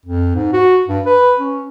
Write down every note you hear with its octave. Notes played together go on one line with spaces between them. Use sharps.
F2
G#2
F#4
G2
B4
C#4